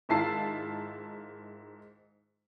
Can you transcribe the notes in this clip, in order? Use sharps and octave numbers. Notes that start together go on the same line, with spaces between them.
G#2 D#3 E4 F4 A5 C7